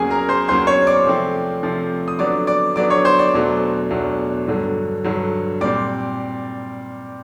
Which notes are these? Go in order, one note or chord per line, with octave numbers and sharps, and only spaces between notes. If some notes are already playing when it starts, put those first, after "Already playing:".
Already playing: E2 C#3 F#3 A#3 G#4 G#5
A#4 A#5
C5 C6
E2 C#3 F#3 A#3 C5 C6
C#5 C#6
D5 D6
C3 F3 A3 C4
C3 F3 A3 C4
D#6
D3 F#3 B3 D4 D5 D6
D5 D6
D3 F#3 B3 D4 D5 D6
C#5 C#6
C5 C6
D5 D6
E2 B2 F#3 A3 D4
E2 B2 F#3 A3 D4
G2 D3 F#3
G2 D3 F#3
A#2 G3 C4 D5 D6